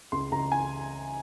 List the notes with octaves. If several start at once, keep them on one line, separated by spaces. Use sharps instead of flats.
C#2 C6
C#2 A#5
G#5